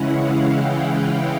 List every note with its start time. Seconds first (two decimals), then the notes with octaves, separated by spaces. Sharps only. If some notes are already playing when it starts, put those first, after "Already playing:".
Already playing: C#3 E3 G#3 C#4 E4 F#5
0.14 F5
0.50 G5